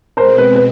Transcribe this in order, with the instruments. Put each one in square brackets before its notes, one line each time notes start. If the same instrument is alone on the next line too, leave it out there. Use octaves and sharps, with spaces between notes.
[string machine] B2 G#3 C4 [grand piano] A#4 C5
[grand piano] B4
B4